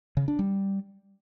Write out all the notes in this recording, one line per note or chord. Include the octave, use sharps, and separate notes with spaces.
C#3
D4
G3